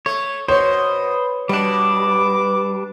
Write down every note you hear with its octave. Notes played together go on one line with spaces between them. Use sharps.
A3 C#5
B2 C5 C#5 D#6
B2 G3 D4 D6